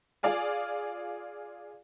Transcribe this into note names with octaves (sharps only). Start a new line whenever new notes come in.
F4 G#4 D5 F5 G#5